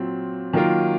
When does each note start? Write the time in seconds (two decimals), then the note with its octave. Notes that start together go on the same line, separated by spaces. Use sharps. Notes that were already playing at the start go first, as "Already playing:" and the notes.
Already playing: A#2 F#3 C4
0.53 D#3 F#3 A#3 F4 A#4